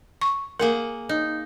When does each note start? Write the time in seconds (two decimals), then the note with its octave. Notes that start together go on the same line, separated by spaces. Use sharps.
0.22 C#6
0.59 A#3 G#4 A#4 F#5
1.09 D#4